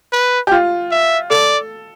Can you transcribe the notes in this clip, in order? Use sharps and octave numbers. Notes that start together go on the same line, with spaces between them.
B4
G4
F4
E5
A4 D5